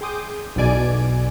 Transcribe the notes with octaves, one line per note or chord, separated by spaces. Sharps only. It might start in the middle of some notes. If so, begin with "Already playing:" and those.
G#4 G5 C6 D6 D#6 G6
B1 E2 B2 D5 G#5 D7